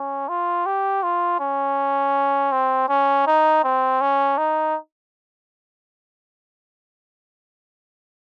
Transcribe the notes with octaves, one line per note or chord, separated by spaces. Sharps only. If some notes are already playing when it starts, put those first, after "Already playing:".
Already playing: C#4
F4
G4
F4
C#4
C4
C#4
D#4
C4
C#4
D#4